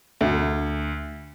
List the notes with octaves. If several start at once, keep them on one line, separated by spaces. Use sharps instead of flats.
D2